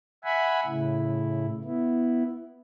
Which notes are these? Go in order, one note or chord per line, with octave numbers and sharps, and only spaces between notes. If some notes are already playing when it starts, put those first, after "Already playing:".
E5 F#5 G#5 B5
A2 C#3 E4
B3 E4